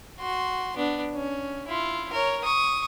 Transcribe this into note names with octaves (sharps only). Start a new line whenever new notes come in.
F#4 C6
B3 D4
C#4
E4 F4
A#4 C#5
C#6 D#6